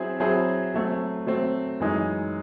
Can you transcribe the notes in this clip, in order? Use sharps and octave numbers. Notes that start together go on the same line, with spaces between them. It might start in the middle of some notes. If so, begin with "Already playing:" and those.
Already playing: F#3 C4 E4 G#4 C5
F#3 C4 E4 G#4 C5
F#3 A3 C4
F#3 A3 C4
F#2 E3 G#3 D#4